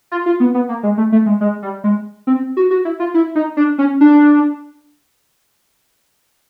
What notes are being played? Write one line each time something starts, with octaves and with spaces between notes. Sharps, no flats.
F4
F4
B3
B3
A#3
G#3
A3
A3
G#3
G#3
G3
G#3
C4
F#4
F#4
E4
F4
E4
D#4
D4
C#4
D4